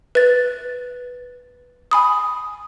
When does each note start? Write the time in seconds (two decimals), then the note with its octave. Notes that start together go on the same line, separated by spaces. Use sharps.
0.15 B4 A6
1.91 G#5 B5 D#6